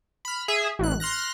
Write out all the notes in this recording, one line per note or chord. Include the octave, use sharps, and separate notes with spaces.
B5 F6
G#4 E5
A1 F#6
C6 F6 F#6 A#6